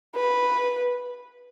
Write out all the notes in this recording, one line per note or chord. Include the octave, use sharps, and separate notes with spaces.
B4